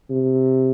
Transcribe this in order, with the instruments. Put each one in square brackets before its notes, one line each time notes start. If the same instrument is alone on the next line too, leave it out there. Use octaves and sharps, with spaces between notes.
[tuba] C3